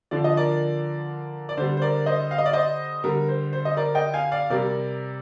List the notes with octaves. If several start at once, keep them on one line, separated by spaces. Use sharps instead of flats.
D3 F3 D5
D#5
A#4 D5
D5
D3 G3 C5
C5
A#4 D5
C5 D#5
F5
D#5
D5
C5 D#5
D3 G3 A#4
C5
C5
D#5
A#4 D5
D#5 G5
F5 G#5
D5 F5
C3 G3 A#4 D5